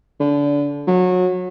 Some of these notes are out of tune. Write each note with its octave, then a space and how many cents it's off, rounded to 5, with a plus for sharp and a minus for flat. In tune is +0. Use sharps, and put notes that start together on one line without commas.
D3 -25
F#3 -25